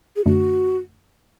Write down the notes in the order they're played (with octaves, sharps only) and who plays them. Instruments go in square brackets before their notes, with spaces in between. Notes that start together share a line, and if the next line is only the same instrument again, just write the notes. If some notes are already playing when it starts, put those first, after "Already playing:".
[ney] G#4
[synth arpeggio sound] F#2 D3 A3 D4 [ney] F#4